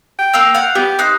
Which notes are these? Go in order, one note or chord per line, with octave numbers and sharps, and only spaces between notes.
G5
A#3 F5 E6
F5 F#5
B3 G4
D#4 C5 F#6